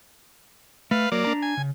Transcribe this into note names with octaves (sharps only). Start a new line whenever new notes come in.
A3 B4 F5
F#3 A#3 D5
D4 A#5
G#5
C#3